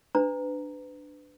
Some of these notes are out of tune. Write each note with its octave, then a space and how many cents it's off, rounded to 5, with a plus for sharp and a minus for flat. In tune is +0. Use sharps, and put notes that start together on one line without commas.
D4 +5 B4 +25 A#5 -10